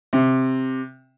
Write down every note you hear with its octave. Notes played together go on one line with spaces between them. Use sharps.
C3